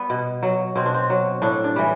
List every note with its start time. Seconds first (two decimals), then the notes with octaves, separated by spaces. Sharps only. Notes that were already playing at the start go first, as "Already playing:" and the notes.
Already playing: G3 B3
0.10 B2
0.43 F#3
0.76 B2 C4
0.86 D4
0.94 C4
1.10 F#3
1.42 A2 D4
1.64 D4
1.76 E3 G3